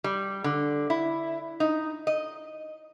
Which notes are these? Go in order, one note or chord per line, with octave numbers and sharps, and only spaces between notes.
G3
D3
E4
D#4
D#5